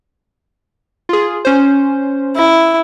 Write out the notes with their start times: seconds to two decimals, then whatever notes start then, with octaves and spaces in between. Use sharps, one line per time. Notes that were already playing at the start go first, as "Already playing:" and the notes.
1.09 F4 G#4
1.45 C#4 C5
2.37 E4